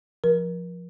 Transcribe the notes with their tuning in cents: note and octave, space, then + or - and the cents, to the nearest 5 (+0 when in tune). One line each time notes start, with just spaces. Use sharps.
F3 +0 A#4 +30